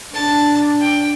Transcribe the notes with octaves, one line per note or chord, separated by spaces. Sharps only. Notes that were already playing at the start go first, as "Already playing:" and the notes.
D4 A5
G5